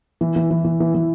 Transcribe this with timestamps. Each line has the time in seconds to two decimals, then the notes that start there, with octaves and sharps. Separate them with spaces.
0.21 E3
0.36 E3
0.51 E3
0.65 E3
0.80 E3
0.94 E3